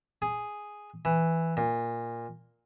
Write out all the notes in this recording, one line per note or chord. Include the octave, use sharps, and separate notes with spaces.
G#4
E3
A#2